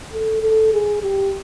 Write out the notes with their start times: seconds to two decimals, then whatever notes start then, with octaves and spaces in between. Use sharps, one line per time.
0.13 A4
0.42 A4
0.73 G#4
1.03 G4